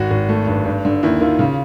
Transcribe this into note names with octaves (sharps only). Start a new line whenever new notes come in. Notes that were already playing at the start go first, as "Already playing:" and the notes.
Already playing: G#1 F#4
G#1
A3
G2
G2
D3
D#2 E4
D#3 F4
C#3